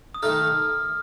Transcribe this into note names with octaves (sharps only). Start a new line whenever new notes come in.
D#6
D#3 A3 D#4 A4 F6